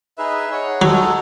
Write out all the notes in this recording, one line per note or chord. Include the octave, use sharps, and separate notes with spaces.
D#4 G#4 B4 E5
D#4 G#4 C#5 F#5
F#3 G#3 D#4 F#4 A4